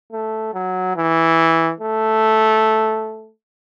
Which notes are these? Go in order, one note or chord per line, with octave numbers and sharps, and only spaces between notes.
A3
F#3
E3
A3